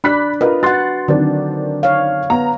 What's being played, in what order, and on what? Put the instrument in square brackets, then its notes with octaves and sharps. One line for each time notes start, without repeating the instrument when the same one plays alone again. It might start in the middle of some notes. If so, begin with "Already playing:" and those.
[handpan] D4 D5 [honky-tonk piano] B5 F#6 B6
[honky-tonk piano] F4 A#4 D#5 [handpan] B4
[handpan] F#4 F#5 [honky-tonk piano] C6 F#6 A6
[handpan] D3 F#3 [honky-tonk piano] D#3 C4 D4
[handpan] C#5 F5
[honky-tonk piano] B3 A#5